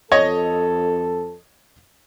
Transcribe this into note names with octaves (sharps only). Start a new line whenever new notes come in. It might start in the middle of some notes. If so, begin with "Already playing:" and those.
F2 A4 C#5 D#5